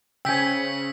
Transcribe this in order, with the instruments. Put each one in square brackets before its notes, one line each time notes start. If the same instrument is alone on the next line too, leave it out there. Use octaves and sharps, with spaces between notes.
[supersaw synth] C#3 [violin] C#4 C5 [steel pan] G5 G#5 [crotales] E6 B6